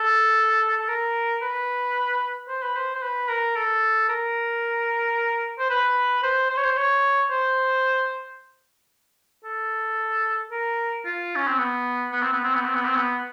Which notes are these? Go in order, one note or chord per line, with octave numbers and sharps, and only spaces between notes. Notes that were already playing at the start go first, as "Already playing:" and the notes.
Already playing: A4
A4
A#4
B4
C5
B4
C5
C5
B4
A#4
A4
A#4
C5
B4
C5
C5
C#5
C5
C#5
C5
A4
A#4
F4
C#4
C4
B3
B3
C4
B3
C4
B3
C4
B3
C4
B3